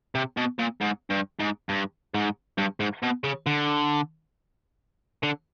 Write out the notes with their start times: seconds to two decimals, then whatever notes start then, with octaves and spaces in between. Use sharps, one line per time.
0.15 C3
0.37 B2
0.59 A#2
0.81 G#2
1.10 G2
1.40 G#2
1.69 G2
2.14 G#2
2.58 G2
2.80 G#2
3.03 B2
3.24 C#3
3.46 D3
5.23 D3